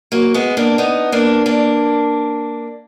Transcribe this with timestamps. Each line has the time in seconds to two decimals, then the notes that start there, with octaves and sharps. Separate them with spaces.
0.12 F#3 A#3
0.34 G#3 B3
0.57 A#3 D4
0.78 B3 D#4
1.12 A#3 D4
1.46 A#3 D4